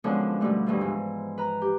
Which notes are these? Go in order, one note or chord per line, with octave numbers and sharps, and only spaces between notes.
F#2 D3 F3 G#3 B3
B2 F3 G3 A3
D2 G2 E3 F3
G#2 G#3
B4 A#5
G4